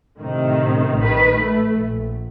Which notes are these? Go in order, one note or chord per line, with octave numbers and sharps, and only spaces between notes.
A2 C3 D#3
A#1 D#3 B4
A3
A#1